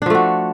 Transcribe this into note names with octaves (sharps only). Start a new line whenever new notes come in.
F3 A3 D4 F#4